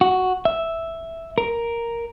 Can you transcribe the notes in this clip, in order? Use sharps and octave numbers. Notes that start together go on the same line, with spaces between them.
F#4
E5
A#4